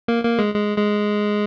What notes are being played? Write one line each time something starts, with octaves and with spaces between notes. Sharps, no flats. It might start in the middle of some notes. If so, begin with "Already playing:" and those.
A#3
A#3
G#3
G#3
G#3